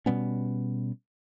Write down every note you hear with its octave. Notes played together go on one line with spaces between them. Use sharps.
B2 G3 B3 C#4